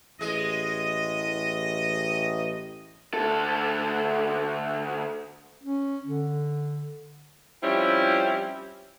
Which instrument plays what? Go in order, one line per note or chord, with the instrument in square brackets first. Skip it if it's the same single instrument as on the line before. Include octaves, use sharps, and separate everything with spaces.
[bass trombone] A1 [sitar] G#3 [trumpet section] D#5
[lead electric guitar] D2 A4
[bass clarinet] C#4
D3
[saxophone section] F3 G3 C4 C#4 E4